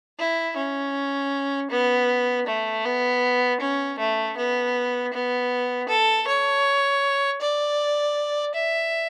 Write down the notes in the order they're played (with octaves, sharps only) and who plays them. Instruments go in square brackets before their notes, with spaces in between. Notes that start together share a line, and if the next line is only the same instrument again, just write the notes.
[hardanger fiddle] E4
C#4
B3
A3
B3
C#4
A3
B3
B3
A4
C#5
D5
E5